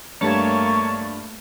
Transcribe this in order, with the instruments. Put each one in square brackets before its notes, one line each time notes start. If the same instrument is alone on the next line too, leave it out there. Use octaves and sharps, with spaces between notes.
[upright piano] G2 G3 [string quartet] A3 A#3 [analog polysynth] C#5 A5